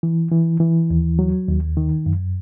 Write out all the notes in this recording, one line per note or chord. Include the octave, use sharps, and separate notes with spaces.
E3
E3
E3
D#2
F#3
D#2
D#3
F#2